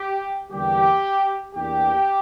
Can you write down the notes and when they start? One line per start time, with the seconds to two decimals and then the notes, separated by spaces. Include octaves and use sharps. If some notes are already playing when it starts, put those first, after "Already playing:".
Already playing: G4
0.51 E2 D3 G3 A#3 G4
1.56 E2 E3 A#3 D4 G4